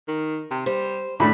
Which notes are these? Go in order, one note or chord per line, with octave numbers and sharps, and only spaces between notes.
D#3
C3
G3 C5
A2 C#3 A3 D4 B5